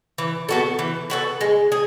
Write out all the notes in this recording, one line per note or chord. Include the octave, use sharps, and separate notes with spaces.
E3
B3 F#4 A4
E3
B3 F#4 A4
G#3
G#4